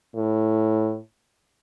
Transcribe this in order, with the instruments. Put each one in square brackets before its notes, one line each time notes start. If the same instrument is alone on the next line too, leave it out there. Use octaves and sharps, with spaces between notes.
[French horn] A2